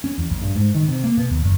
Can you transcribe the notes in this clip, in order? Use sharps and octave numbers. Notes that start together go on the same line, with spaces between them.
C#4
E2
A#1
G2
G#2
D#3
C3
A#3
B2
D#2
F#1